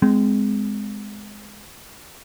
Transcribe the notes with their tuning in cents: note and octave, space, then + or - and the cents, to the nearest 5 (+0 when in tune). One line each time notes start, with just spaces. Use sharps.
G#3 +0 C4 -35